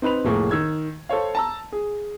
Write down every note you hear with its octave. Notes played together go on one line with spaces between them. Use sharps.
C4 D#4 B4 B5 F7
F1 A2 A#3 G#4
D#3 E6 G#6
A4 C5 C#5 F5
A5 A#5 E6
G#4